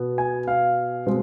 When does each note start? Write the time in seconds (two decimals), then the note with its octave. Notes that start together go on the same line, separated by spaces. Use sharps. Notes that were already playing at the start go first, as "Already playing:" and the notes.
Already playing: B2 B3
0.18 G#5
0.48 F5
1.07 B2 G#3 C4